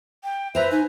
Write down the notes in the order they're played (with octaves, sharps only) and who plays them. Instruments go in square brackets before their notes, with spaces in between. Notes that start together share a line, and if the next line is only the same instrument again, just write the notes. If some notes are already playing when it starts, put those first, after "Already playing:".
[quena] G5
[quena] B4 [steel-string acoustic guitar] C5 A#5 [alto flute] E5
[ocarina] D#4 [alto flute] G#5